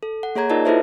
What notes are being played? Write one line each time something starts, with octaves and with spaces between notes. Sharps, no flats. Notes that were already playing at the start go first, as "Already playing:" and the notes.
A4
F#5
A#3 G#4 C#5 A#5 G#6
D#4 F4 A#4 D5 D#5 A5
E4 F4 A4 B4 C5 E5